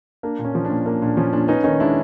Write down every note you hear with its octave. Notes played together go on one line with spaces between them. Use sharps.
A#3 D4
A#2
C#4
F3
D4
A#2
A#3 D4
A#2 D4
F3 C#4
A#2 D4
B3 C#4 D#4
D#3 C#4 D#4
G#3 D4 E4